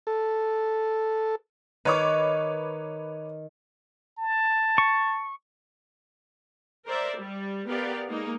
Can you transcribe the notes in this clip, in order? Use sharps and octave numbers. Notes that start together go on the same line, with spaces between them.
A4
D#3 B4 C#5 D6
A5
C#6
A#4 C5 D5 E5
G3
B3 G4 A#4 D5 F5
G#3 A#3 D#4